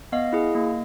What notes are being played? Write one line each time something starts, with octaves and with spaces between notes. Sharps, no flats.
B3 D#5 F5
E4 G#4
A#3